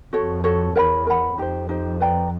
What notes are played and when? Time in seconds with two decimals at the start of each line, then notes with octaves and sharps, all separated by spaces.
0.13 F2 F#4 A4 C#5
0.44 F#4 A4 C#5
0.75 E2 A#4 C#5 F#5 B5
1.06 A#4 C#5 F#5 B5
1.38 F2 D#4 G4 C5
1.69 D#4 G4 C5
2.00 B4 D5 G5 A#5